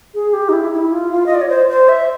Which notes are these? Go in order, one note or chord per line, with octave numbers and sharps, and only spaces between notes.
G#4
G4
D#4
E4
E4
F4
F4
D#5
D5
C#5
C5
C5
E5